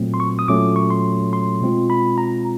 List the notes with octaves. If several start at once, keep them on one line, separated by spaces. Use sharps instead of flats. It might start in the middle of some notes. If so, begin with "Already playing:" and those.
Already playing: A#2 F#3 A3 C4
C6
C#6
D#6
A#2 F#3 A3 C#4 D6
C#6
C6
C6
B2 G#3 C4 F4
B5
A#5